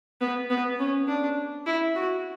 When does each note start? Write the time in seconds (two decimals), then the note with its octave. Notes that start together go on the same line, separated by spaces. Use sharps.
0.21 B3
0.50 B3
0.79 C#4
1.08 D4
1.66 E4
1.95 F#4